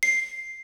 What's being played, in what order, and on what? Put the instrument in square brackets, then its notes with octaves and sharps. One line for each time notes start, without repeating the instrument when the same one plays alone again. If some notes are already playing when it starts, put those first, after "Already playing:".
[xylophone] C7